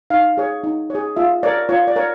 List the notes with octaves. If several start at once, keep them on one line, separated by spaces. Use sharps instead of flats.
D#4 F5
G#4 C#5
D#4
G#4 C#5
F4 E5
A#4 C#5 D5
F4 C#5
D5
A#4 C#5